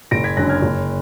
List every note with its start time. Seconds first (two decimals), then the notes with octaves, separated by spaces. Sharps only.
0.11 F#1 A#6 D7
0.24 G#6 B6
0.37 F#2 D3 F#6 A#6
0.49 F6 G#6
0.63 F#1